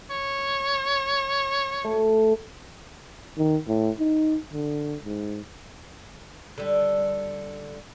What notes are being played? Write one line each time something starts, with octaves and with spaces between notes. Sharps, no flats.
C#5
A3
D#3
A2
D#4
D3
G#2
D3 G3